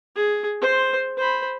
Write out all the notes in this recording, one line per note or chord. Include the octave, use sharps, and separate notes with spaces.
G#4
C5 C6
C5 B5